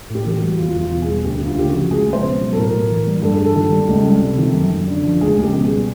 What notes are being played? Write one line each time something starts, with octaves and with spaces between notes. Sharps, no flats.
A2
G4
E3 G4
F#4
G3
E2 F4
E2
F4
B2
G#4
G3
D2 G4
D2
F4
C#3 G4
F3 F#4
C#2 G#4
C#2
C5
B2
F#3
A4
A2 A#4
A2
E3
G3
G2 A4
G#4
G2 A4
D#3
G3
C#2
G3
C3
D#3
F#2
F#2
D3
F3
C#2 G#4
C#2
G4
B2
G#4
G3